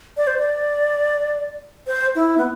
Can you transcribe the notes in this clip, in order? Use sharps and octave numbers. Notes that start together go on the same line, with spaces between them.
D5
C5
D5
C5
E4
B3